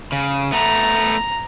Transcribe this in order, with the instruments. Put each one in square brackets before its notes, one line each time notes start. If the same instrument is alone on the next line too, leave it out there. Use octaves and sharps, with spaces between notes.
[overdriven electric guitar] C#3
[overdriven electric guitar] A3 B3 [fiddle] A#5